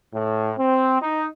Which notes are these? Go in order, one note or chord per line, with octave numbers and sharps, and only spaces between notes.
A2
C4
D#4